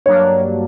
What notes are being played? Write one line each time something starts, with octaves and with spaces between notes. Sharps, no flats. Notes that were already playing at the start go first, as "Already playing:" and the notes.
G2 F#3 A#3 D4 C#5